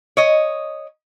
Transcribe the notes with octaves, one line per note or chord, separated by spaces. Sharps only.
C#5 D#5